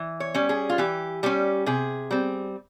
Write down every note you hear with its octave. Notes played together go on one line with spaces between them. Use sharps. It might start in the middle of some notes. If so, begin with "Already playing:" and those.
Already playing: E3
C#5
G3 C#4
G#4
F4
E3 G4
G3 C#4 G4
C3 G#4
G3 C4